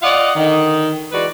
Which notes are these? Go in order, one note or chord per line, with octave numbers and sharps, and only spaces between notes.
F4 D5 D#5 F5 F#5
D3 D#3
E3 G#3 F#4 B4 D5